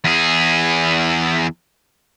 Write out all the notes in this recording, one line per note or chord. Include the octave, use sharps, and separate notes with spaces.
E2 G#4